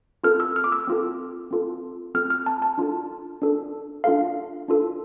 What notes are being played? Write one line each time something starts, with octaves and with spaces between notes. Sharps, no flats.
C4 F4 A4 F6
E6
F6
D6
E6
C4 F4 A4
C4 F4 A4
C4 F4 A4 F6
F6
A5
A5
D4 F4 A4
D4 F4 A4
D4 F4 A4 F5
D4 F4 A4